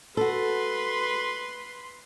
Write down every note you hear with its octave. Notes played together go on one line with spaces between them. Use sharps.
F#4 A4 B4 C6